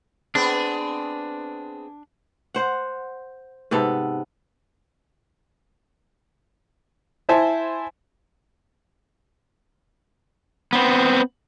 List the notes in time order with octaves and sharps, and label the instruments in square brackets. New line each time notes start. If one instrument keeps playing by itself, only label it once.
[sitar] B3 C4 G#4 [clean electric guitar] D4
[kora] C5 F#5
G#2 C3 B3 A4
[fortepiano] E4 C5 E5 G#5 A5
[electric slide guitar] B3 C4